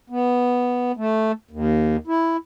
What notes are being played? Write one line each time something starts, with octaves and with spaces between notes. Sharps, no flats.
B3
A3
D#2
E4